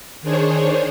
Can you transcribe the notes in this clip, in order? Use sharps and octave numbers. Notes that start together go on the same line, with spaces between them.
D#3 D4 G#4 C5 C#5